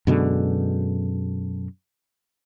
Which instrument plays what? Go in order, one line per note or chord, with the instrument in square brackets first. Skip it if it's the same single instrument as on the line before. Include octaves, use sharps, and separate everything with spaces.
[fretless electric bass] F#2 B2 D3 G#3